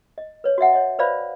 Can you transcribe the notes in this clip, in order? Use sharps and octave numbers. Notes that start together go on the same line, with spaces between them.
D#5
B4 C#5
F#4 C#5 E5 F#5
C#5 D#5
B4 C5 D5 F5 B5